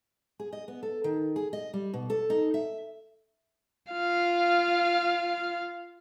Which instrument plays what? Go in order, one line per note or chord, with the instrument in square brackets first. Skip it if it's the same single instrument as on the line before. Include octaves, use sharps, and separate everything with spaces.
[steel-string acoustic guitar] G#4
D#5
B3
A4
D#3
G#4
D#5
G3
B2
A4
D#4
E5
[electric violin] F4 F5